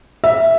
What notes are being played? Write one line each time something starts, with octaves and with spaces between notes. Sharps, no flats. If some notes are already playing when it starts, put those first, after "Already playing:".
E5